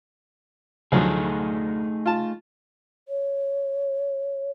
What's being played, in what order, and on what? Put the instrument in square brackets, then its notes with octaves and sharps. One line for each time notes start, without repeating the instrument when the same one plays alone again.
[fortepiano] D2 F3 F#3 [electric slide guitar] A3 D#4 G#4
[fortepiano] F4 A5
[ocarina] C#5